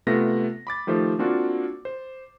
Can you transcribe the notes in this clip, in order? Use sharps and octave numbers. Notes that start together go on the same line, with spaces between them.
C3 A3 B3 F4 A#6
B5 D6 A6
D#3 F3 A3 G4 C5
A#3 C4 D4 F4 F#4
C5